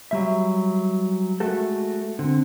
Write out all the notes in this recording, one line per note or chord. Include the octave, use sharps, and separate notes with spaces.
F#3 G3 E5
G#3 A3 F#4 A4
D3 C4